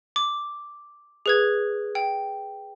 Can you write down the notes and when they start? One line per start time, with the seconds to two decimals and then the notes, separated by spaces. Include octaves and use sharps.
0.16 D6
1.26 G#4 B4 G#6
1.95 G5